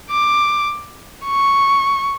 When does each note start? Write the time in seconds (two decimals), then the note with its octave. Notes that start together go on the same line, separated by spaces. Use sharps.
0.11 D6
1.26 C#6